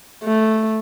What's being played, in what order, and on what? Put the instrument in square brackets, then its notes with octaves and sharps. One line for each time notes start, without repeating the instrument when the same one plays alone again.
[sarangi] A3